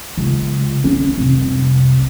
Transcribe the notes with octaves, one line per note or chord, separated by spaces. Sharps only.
C#2
C#4
F1 C2